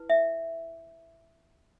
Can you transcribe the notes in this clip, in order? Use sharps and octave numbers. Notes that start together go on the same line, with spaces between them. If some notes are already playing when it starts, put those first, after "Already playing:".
Already playing: E4 B4
E5